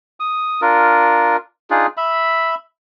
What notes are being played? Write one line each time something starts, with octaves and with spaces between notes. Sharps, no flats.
D#6
D4 F4 A#4
D4 D#4 F4 G#4
E5 B5